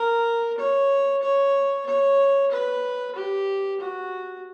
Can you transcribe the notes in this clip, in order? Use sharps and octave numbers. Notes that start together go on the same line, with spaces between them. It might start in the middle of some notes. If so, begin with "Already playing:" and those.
Already playing: A#4
C#5
C#5
C#5
B4
G4
F#4